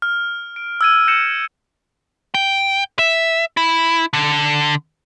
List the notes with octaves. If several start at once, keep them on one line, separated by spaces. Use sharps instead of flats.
F6
D7
E6 G#6 D#7
G6 A#6 C#7 E7
G5
E5
E4
D3